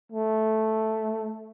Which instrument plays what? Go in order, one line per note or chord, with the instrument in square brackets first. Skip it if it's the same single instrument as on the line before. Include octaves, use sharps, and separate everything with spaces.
[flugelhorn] A3